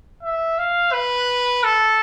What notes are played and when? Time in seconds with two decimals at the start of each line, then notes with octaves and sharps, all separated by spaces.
0.23 E5
0.58 F5
0.92 B4
1.64 A4